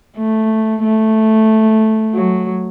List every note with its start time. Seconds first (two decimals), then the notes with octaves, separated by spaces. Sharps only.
0.17 A3
0.83 A3
2.14 F#3